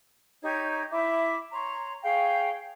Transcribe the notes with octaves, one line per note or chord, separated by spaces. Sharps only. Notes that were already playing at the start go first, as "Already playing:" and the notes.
D#4 G4 C#5 G#6
E4 E5 D6
C#5 A#5 C6
G#4 C#5 F5 G5